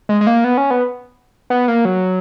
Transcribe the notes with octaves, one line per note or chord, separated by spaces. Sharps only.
G#3
G#3
A#3
B3
C#4
B3
B3
A#3
F#3